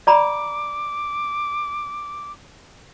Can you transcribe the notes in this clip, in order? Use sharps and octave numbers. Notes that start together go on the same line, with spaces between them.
D5 A#5 B5 D6